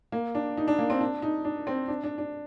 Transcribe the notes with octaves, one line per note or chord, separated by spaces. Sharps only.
A#3
D4
D#4
D4
A#3
C4
D4
D#4
D4
C4
D4
D4
D4